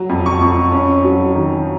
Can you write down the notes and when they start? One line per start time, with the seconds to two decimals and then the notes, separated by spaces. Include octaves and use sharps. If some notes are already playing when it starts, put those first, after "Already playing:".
Already playing: F#3
0.09 F2
0.26 C#6
0.41 F2
0.72 C#4
1.04 F#3
1.35 D#3